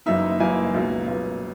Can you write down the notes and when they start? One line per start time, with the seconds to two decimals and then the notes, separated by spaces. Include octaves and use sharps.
0.06 F#1 F#2 E3 A#3 D#4 E5
0.40 F#1 F#2 E3 A#3 D#4 G#5
0.74 C#2 B2 F#3 A#3
1.07 C#2 B2 F#3 A#3